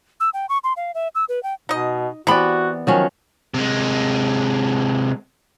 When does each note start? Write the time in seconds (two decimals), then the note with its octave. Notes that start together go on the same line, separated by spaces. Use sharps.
0.20 E6
0.34 G5
0.49 C#6
0.64 C6
0.77 F5
0.95 E5
1.15 E6
1.29 B4
1.43 G5
1.69 B2 D#4 D#5
2.27 C3 E3 B3 F#4 D5 B5
2.87 D#3 F3 F#3 C#4
3.54 C3 G#3